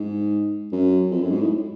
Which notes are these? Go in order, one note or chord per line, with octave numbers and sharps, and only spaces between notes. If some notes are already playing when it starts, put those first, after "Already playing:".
Already playing: G#2
F#2
F2
F#2
G#2
A2